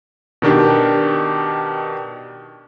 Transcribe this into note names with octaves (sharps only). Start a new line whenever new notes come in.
B2 D#3 D4 G4